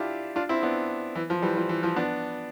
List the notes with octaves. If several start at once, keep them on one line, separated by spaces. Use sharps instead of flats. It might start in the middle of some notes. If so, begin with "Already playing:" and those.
Already playing: D4 E4 F4 G4
D4 F4
C4 E4
B3 D4
E3
F3
E3 G3
F3
E3
F3
B3 D4